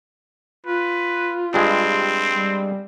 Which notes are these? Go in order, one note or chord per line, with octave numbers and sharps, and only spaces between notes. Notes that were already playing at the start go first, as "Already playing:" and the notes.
F4 B4
G2 G#3 C4
G3